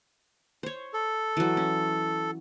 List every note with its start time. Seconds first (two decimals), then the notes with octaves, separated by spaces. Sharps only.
0.63 C5 C#5
0.94 A4
1.37 E3 F#3
1.57 C#4